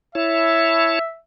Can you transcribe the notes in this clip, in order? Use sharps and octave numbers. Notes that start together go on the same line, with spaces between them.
E4 C#5 E5 A5